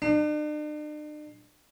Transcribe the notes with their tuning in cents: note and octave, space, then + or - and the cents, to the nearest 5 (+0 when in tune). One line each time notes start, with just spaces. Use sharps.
D4 +45